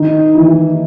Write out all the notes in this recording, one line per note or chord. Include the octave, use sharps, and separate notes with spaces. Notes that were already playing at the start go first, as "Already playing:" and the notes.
Already playing: D#3 D#4
E3 E4